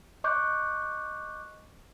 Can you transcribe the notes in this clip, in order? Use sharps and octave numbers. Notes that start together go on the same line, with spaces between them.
D#5 C#6 D6 F#6 G6